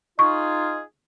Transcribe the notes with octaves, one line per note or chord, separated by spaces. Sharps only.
D#4 F4 G#4 C#6